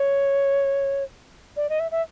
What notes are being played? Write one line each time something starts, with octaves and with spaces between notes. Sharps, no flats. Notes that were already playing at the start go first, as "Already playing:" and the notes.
Already playing: C#5
D5
D#5
E5
E5